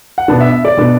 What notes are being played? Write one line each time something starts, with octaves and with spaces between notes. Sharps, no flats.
F#5
B2 B3 D4 A5
E5
E5
D5
B2 B3 D4